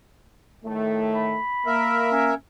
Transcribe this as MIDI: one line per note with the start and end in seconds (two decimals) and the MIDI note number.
0.65 1.38 45
0.65 1.38 51
0.65 1.38 57
1.14 2.10 83
1.66 2.31 58
1.66 2.34 70
1.66 2.34 76
2.12 2.34 61